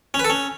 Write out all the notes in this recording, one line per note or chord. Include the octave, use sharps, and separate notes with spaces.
C#4
B4
A4
C#4